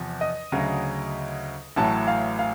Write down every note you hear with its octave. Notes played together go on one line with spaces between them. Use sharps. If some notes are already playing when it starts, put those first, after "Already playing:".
Already playing: E2 C3 F3
D#5
D2 C#3 F#3
A1 A2 F#3 A5
F5
F5